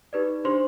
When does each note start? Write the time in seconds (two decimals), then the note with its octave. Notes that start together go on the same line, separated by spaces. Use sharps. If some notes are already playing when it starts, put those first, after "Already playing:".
0.13 D#4 G4 B4 D5
0.44 D4 G4 C5 C6